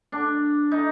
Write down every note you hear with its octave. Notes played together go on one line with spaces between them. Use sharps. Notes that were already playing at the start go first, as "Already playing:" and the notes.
D4
D#4